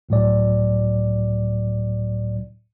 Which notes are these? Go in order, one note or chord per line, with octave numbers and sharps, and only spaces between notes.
C#2 A2 F#3 D5